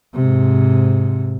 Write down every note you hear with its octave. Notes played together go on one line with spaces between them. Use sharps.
G#2 C3